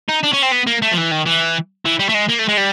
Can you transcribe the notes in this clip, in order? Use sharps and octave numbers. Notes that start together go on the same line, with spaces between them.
D#4
D4
C#4
C4
B3
A#3
A3
F3
E3
D#3
E3
E3
G3
A3
G#3
A#3
A3
G#3
G3